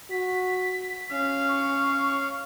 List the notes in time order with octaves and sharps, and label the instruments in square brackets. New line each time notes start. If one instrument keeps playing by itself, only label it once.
[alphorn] F#4 [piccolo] B6
[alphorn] C#4 [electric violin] F5
[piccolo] C#6